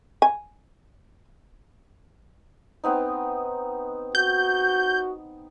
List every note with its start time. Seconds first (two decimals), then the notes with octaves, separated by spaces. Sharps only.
0.22 G#5
2.84 B3 C4 D#4
4.15 F#4 G6